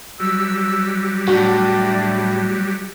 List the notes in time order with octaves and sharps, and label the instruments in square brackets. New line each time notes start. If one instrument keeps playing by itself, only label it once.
[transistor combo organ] F#3 G3 [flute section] E6
[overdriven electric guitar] A2 [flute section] D4 [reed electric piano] F#4